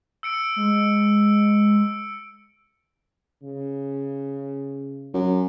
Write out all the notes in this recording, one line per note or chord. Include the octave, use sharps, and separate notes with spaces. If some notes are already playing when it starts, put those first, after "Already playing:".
E6 C#7 D7
G#3
C#3
F#2